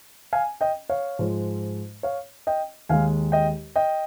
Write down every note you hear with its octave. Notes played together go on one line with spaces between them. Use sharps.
F5 G#5
D#5 G5
C#5 F5
G#2 F3 G#3
C#5 F5
D#5 G5
D#2 D#3 G#3 F5 G#5
D#5 G5
D#5 G5